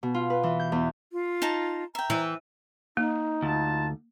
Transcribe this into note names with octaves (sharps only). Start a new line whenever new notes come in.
B2
F4
B4
E3
G6
E2
F4
D#4 A5 A#5
E5 G5 A#5
E3
A#3 D#4
D2 F4 A5